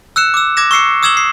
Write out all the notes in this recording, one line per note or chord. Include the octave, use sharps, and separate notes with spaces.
E6 F#6 C#7 E7
D6 E6
D6 G#6 A#6 E7
C#6 E6 C7 C#7
D#6 E6 G#6 E7 F#7 G7
C7